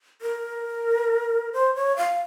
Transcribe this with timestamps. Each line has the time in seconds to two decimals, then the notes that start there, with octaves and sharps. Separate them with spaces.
0.22 A#4
1.53 C5
1.75 C#5
1.97 F5